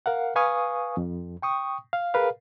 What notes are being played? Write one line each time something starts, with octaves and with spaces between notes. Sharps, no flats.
A#4 F5 F#5
B4 F5 G#5 C#6 D#6
F2
G5 C#6 D#6
F5
G#4 A#4 B4 F5